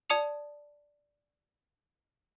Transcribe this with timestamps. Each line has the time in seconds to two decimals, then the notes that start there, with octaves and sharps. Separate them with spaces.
0.10 D5 A5 D#6 C#7 F7